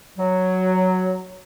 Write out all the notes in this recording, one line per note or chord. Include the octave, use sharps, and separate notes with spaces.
F#3